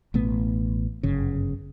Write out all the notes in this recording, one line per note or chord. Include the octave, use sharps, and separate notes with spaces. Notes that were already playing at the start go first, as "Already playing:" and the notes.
A1 B2 A3 B3
G1 F#2 C#3